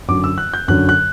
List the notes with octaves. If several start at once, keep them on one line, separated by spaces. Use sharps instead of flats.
F#2 D3 F#3 D6
E6
F#6
G6
F#2 D3 F#3 F#6
F#6